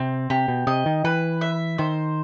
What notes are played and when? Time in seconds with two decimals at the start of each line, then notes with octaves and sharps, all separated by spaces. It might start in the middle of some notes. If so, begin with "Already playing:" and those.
Already playing: C3 C4
0.30 C3 G4
0.48 B2
0.67 C3 D#5
0.86 D#3
1.04 E3 B4
1.41 E5
1.78 D#3 C5